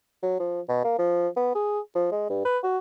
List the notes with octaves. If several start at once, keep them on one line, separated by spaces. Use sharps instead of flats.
F#3
F3
B2
A#3
F3
B3
G#4
F3
G#3
G2
B4
F#4